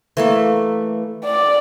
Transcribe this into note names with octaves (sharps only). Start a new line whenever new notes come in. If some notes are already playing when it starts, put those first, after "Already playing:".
E3 A3 A#3
D5